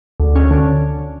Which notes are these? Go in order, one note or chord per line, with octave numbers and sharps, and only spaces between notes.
D2
C#4
D3